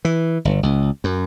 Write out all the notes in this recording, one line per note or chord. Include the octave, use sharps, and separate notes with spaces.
E3
G1
C#2
F#2